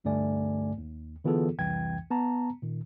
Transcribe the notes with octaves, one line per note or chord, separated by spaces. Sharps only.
C2 G2 D3 A3 D5 G#5
D#2
D3 E3 B3 F4 G#4 A4
C2 F2 E3 G5 G#6
B3 A5 A#5
A#2 D#3